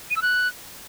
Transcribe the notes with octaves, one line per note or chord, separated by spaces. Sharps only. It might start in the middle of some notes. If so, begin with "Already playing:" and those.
D#7
E6
F#6